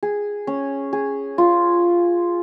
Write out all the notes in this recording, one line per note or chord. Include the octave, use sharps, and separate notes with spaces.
G#4
C#4
G#4
F4